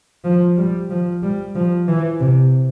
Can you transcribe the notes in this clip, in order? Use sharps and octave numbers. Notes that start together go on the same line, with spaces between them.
F3
G3
F3
G3
F3
E3
C3